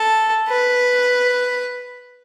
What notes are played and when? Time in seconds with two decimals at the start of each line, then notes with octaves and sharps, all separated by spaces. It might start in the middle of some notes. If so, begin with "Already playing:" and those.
Already playing: A4
0.48 B4